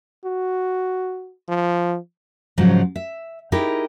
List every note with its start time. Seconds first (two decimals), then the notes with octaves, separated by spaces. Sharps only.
0.25 F#4
1.49 F3
2.58 G#2 C#3 F3 F#3
2.96 E5
3.52 D#4 E4 G4 G#4 A#4